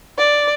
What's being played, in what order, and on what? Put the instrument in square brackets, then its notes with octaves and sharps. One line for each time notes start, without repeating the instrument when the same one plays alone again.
[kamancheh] D5